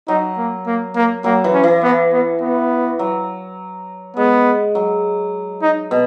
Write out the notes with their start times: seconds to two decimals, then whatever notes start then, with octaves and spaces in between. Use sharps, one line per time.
0.08 F#3 D#4
0.37 A#3
0.66 A#3
0.96 A#3
1.24 F#3 A#3
1.44 E3
1.54 C#4
1.64 E3
1.83 B3
2.13 B3
2.41 B3
2.99 F#3
4.17 G#3 B3
4.75 F#3
5.62 D#4
5.91 B2